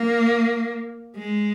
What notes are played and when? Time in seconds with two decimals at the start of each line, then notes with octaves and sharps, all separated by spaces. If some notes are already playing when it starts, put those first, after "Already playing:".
Already playing: A#3
1.17 G#3